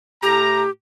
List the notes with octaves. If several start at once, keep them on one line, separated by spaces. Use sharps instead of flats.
A2 G4 A#5